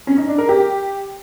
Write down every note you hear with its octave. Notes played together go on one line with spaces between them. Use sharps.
C#4
D#4
D4
A#4
G4